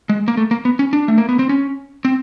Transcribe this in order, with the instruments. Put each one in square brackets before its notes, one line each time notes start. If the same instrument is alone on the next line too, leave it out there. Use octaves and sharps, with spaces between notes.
[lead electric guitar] G#3
A#3
A3
A#3
B3
C#4
D4
A3
A#3
B3
C4
C#4
C4